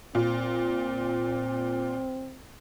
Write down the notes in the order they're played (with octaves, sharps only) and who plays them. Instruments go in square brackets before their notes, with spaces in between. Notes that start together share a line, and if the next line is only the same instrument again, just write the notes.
[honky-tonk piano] A#2 [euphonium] C4